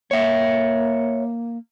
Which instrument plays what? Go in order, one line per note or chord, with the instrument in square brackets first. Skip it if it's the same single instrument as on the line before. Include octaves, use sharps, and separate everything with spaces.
[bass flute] A#3 [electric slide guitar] C#5 E5